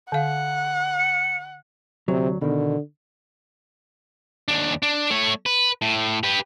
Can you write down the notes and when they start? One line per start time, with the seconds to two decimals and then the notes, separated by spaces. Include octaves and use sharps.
0.12 D3 F5 F#5
0.98 C#7
2.08 D2 C3 F#3
2.41 B2 D3 D#3
4.48 D#2 D4
4.83 D4
5.10 A3 C#5
5.46 B4
5.82 A2
6.23 G4 B4